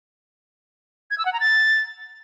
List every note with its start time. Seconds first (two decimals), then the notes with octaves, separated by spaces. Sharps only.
1.11 G#6
1.18 E6
1.25 F#5
1.33 A#5
1.40 A6